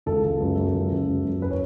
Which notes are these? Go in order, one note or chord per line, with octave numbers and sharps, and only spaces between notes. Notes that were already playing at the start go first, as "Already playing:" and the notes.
C#2 A4
C#2
F#2
F#2
C#2
C#2
F#2
F#2
B4
C#5